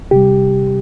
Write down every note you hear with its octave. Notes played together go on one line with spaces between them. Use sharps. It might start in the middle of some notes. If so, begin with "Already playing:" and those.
C3 G3 G4